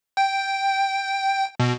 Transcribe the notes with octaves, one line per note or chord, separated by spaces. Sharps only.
G5
B2